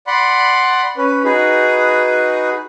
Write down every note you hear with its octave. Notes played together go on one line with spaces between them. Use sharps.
D5 F#5 B5 C6
C#4 B4
D#4 F#4 G#4 B4